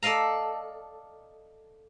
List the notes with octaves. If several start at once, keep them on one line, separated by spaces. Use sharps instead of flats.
A4 D5 D#5 F5 A#5